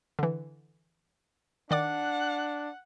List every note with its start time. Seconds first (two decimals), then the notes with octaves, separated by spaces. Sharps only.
0.19 D3 E3
1.71 D#3 D4 D5 F#5 D6